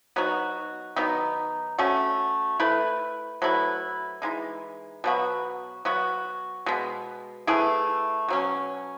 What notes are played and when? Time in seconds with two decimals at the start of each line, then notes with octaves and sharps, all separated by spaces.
0.16 F#3 B3 D#4 F#4
0.96 D#3 F#3 B3 D#4
1.78 A3 C#4 F#4
2.60 A3 E4 B4
3.42 F#3 A3 E4 B4
4.22 E3 G#3 D#4
5.04 B2 F#3 B3 F#4
5.85 F#3 B3 F#4
6.66 B2 G#3 B3
7.47 A3 E4 G#4 B4
8.28 B2 F#3 C#4